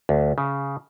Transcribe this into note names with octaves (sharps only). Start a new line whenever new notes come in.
D2
C#3